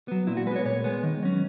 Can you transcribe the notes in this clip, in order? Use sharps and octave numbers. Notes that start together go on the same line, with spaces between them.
F#3 B3
A#2 E4
F#4
G#3 B3 B4 C#5
A#2 C#5
G#3 B3
D#3
F#3 C#4